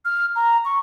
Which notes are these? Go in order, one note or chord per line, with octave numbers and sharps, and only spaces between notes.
F6
A#5
C#6